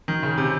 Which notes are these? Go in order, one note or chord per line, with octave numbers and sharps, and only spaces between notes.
D#3
C#3
C3